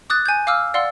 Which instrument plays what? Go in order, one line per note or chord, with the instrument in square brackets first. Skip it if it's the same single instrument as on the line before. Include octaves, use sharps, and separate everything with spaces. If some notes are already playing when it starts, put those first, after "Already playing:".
[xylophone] D6 D#6 F#6 A6
G#5 G6
F5 D6 E6 F6
D5 F5 F#5 C6 E6